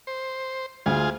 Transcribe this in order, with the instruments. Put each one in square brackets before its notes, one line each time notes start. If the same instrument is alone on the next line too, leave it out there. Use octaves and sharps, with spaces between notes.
[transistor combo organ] C5
[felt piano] D2 [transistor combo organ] F4 G#4